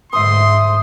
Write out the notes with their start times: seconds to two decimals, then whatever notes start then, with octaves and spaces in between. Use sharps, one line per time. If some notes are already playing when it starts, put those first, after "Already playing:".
0.13 G#2 D3 C5 E5 C6 D#6